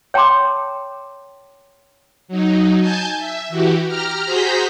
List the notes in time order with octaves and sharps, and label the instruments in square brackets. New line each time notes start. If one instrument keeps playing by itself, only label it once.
[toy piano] C#5 G5 A5 A#5 C6 D6
[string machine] F#3 D#4
G#5 A5 G6
E5
E3 F#4 G4
G4 A#5 F6
F#4 G#4 C5 A#5 G6 B6